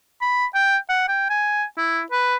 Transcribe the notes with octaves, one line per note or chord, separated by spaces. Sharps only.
B5
G5
F#5
G5
G#5
E4
B4